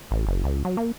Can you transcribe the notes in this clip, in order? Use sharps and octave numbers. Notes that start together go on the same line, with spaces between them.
A1
F#1
C#2
F#3
A#3